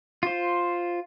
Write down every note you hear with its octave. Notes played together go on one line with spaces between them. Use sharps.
F4 C5